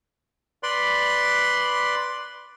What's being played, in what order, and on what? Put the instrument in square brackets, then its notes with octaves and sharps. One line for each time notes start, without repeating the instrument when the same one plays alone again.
[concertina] B4 D5 B5 C6